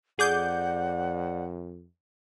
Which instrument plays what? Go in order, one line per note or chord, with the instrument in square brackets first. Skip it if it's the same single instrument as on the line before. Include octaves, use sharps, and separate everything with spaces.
[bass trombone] F2 [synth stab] G#4 D6 G6 [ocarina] D5 [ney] F#5